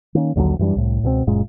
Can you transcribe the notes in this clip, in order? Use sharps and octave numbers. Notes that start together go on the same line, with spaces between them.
D#3 A#3 C#4
A#1 D#2 D3 F#3
F#2 E3 G3 D4
C2 A2
C#2 B2 F#3 C4
F#1 F#2 A#2 G#3